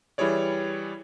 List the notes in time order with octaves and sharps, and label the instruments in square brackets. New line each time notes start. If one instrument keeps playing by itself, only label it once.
[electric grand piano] E3 G3 E4 G#4 C#5 D5